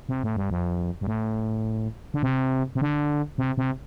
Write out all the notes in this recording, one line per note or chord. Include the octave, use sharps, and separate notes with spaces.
C3
A2
G2
F2
G2
A2
D3
C3
C3
D3
C3
C3